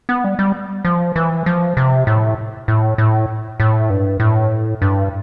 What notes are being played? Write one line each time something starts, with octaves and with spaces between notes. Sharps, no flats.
B3
G3
G3
F3
E3
F3
C3
A2
A2
A2
A2
G2
A2
G2